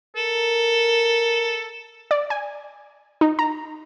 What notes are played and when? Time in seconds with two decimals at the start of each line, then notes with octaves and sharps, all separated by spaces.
0.16 A4 A#4
2.11 D5
2.30 G#5
3.21 D#4
3.39 A#5